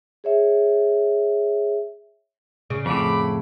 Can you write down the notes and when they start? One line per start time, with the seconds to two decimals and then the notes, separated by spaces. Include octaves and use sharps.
0.24 G#4 C#5 E5
2.70 C#3
2.86 F2 A2 B5 D6